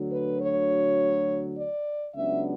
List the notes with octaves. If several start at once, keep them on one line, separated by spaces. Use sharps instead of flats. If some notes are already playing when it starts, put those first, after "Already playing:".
Already playing: D2 D3 F#3
B4
C#5
D5
C#2 C#3 F#3 B3 D4 E5